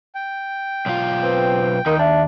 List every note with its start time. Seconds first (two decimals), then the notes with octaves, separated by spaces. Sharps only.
0.15 G5
0.86 B1 F4
1.23 C4 B4
1.86 D#2 D#4 A#4
1.99 D4 E5